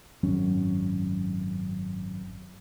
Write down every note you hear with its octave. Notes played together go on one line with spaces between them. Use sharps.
G#1 F#2 C#4